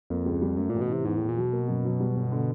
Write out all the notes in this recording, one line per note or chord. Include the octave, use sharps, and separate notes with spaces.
F2 A#3
C#2
G3
F#2 A3
A1 A#2
B2
C3 E3
E2 G#2
E2 A2
A#2
B2 F#3
A#3
F#2
F#3
G3
G1
D3